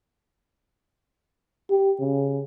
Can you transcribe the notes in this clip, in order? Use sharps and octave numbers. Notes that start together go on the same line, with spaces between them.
G4
C#3